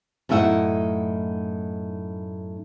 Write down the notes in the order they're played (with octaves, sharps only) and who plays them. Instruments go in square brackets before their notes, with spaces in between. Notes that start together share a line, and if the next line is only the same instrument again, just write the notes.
[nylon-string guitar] F#2 A2 D#4 E5 F#5